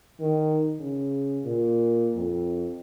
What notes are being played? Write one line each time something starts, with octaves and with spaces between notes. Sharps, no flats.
D#3
C#3
A#2
F2